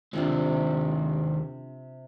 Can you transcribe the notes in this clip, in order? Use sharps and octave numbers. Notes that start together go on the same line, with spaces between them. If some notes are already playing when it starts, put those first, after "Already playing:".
D#2 C3 F3 C4 D4